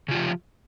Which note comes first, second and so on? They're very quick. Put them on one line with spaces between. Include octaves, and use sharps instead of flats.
C#3 F4 G4 F3